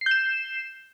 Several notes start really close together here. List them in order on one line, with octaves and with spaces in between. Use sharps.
C7 G6 E7